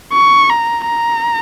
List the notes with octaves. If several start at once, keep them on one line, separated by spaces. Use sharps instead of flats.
C#6
A#5
A#5